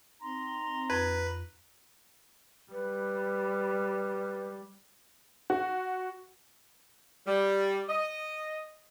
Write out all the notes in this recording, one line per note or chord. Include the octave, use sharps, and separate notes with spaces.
C4 D#4 A#5 C6
F2 B4
G3 B4
F#4
G3
D#5